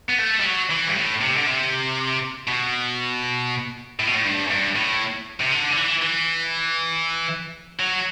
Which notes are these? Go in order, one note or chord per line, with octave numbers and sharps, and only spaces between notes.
B3
A3
G3
F#3
E3
G2
A2
C3
D3
C3
B2
A2
B2
A2
G2
F#2
G2
A2
C3
D3
D3
E3
E3
F#3